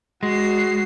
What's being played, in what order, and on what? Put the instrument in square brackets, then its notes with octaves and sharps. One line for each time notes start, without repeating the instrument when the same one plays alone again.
[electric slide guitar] G#3 [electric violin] F#4 C7